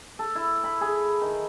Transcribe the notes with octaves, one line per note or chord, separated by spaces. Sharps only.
A4
E4
B5
G#4
D#3